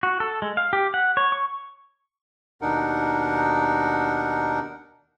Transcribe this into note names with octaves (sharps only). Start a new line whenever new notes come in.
F#4
A4
G#3
F5
G4
F#5
C#5
C#6
D#2 B2 D4 D#4 A#4 F#5